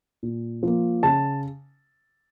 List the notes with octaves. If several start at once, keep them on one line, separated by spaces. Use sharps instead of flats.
A#2
F3 A#3
C#3 A5